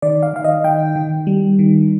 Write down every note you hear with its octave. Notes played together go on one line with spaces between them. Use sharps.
D#3 D5
F5
D#3 F5
D#5
D#3 G5
D#3
G3
D#3